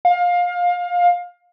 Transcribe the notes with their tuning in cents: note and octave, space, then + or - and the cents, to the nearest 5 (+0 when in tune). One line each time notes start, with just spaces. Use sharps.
F5 +25